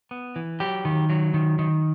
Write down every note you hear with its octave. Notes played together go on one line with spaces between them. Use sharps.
B3
E3
F#3 G4
D#3
F#3
D#3
D#3